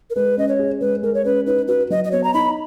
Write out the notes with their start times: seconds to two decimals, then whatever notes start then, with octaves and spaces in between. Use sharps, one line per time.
0.10 A#4
0.15 G#3 B4
0.37 C#4 D#5
0.49 C#5
0.59 G#4
0.80 G#3 B4
1.03 G#3 A#4
1.14 C#5
1.25 C#4 B4
1.47 D#4 B4
1.68 F#4 B4
1.90 F#3 D#5
2.04 D#5
2.12 B3 C#5
2.24 A#5
2.34 D#4 B5